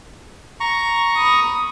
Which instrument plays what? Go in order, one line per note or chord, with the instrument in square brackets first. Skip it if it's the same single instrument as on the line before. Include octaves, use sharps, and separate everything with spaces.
[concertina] A#5 C#6
[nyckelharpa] B5 D#6